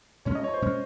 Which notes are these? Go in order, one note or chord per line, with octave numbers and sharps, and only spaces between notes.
A#2 G#3 C#4 C#5
D#5
C#5
C5
A#2 G#3 C#4